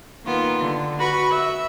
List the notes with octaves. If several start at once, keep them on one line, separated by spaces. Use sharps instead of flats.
D#3 A#3 B3 F4
D3
F#4 B4 B5 C#6
E5